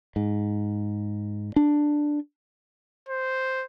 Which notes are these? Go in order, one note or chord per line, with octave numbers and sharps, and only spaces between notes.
G#2
D4
C5